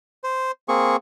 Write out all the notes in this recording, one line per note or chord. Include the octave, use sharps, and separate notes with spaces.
C5
A#3 C4 G#4 C#6